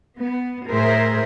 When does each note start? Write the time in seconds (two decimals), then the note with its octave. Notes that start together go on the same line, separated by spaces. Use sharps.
0.20 B3
0.70 A2 G#4 A#4 C5 E5